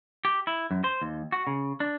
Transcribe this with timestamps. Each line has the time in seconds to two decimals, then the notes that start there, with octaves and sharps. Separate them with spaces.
0.25 G4
0.47 E4
0.71 F#2
0.84 C5
1.02 D#2
1.32 F#4
1.47 C#3
1.80 D4